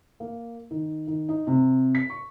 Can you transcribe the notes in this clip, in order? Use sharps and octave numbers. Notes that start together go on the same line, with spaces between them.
A#3
D#3
D#3
D#4
C3
B6
C#6